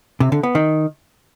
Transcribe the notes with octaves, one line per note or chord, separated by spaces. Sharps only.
C3
D3
B3
D#3